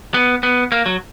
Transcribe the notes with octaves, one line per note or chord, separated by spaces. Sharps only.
B3
B3
A#3
F#3